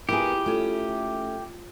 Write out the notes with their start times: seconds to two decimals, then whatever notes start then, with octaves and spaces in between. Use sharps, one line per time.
0.09 B3 E4 F4 G4 G#4 A#4
0.46 A3 C#4 F4